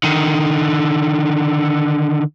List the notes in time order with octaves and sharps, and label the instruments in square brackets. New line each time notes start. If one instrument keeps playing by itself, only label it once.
[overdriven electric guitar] D3 D#3